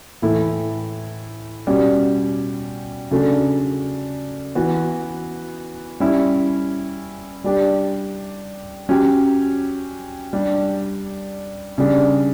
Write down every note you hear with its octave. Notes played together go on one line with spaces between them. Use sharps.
A2 E3 A3 E4
B2 G3 C#4 G4
C#3 F#3 A3 D4
E3 B3 F#4
G3 C#4 E4
G3 D4 G4
F#3 C#4 G4
G3 D4 G4
C#3 G3 D4